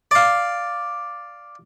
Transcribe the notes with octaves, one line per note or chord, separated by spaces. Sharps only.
D5 F5